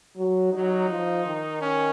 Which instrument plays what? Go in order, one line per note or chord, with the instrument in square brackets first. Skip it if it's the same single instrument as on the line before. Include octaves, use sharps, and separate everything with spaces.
[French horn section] F#3
[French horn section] F#3 [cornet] D#4
[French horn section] F3
D#3
[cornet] C#4